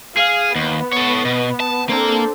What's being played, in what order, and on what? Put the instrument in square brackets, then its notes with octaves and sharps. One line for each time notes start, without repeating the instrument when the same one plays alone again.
[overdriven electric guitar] G#4 [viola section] F5
[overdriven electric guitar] D#2 [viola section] B3
[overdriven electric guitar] A4 C#5
B2
A5
[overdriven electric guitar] A#3 A#5 [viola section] C4 D4 A4